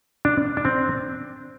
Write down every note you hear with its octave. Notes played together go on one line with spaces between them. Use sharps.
D4
D4
C4